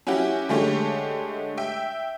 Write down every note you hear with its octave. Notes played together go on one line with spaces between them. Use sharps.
C#4 E4 F#4 G4
D3 G#3 A3 G4 C#5
E5 G5